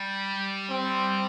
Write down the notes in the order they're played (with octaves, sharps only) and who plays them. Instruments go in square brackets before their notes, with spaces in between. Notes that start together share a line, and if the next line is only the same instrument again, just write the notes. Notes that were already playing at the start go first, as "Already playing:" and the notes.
Already playing: [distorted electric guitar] G3
[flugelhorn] C4